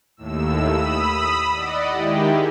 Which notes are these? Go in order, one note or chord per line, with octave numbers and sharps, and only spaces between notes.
D#2 A2 E6
B5 D#6 E6
D5 D#5 F#5
D#3 G#3 E4 G4